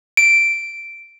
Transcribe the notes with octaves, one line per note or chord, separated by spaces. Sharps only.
D7